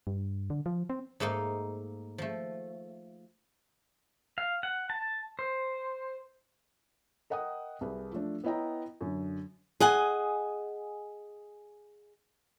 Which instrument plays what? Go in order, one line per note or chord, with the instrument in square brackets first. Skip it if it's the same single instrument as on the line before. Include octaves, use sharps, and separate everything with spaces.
[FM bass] G2
D3
F3
C4
[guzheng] G#2 A3 A#3 D#4
F3 A3
[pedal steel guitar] F5
F#5
A5
C5
[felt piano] A#4 D#5 F#5 G5 D#6
C2 G#4 B4
F3 A3 D4
B3 E4 C#5 D#5 G5 A#5
F#2 D3
[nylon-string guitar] G#4 D#5 F#5 G#5